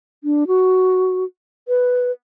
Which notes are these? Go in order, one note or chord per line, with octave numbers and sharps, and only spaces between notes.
D4
F#4
B4